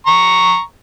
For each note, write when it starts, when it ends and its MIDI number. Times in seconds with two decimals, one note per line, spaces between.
0.07 0.60 82
0.07 0.60 85